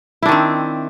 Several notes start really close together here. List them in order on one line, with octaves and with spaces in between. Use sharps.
E4 D4 D#3 C4